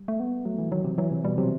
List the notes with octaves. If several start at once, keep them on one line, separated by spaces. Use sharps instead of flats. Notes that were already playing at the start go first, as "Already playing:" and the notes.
Already playing: G3
A3
B3
F#3 A3
E3
D#3 F#3
C3
E3 F#3
C3
B2 G3
C3 F#3